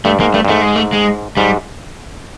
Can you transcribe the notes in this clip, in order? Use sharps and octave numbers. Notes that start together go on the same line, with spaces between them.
G2 A3
G#2 A#3
G2 A3
G2
G#2 A3
G#3
A3
G#3
G#2 G3